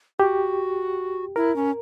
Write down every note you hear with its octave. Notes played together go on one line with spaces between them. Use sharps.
F#4 G4
E4 A#4
C#4